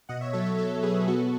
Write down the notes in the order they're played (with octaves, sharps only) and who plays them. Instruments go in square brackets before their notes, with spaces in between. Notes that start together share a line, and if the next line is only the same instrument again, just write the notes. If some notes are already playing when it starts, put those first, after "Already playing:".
[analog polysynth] B2 D#5 F#5
C#5 E5
F#3 A4 C#5
A4 C#5
F#3 A4 C#5
B2 G#4 B4
B3 F#4 A4